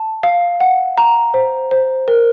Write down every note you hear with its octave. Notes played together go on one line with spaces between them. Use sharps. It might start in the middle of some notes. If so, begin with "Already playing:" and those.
Already playing: A5
F5
F#5
A#5
C5
C5
A#4